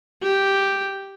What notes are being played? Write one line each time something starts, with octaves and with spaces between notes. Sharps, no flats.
G4